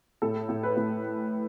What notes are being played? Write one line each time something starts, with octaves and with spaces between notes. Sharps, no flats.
A2 A4
A2
B4
A2